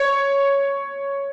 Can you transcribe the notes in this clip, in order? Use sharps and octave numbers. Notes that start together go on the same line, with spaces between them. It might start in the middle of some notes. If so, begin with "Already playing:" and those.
Already playing: C#5